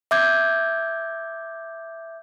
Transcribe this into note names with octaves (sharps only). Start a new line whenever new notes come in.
E5 D6 G6 G#6